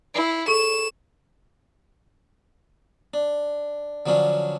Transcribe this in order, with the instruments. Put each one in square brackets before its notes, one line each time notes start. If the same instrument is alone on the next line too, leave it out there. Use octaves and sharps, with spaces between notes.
[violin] E4 [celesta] C7 D7
[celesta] G#4 A4 C#6 [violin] E7
[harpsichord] D4
D3 F3 F#3 C#4 D4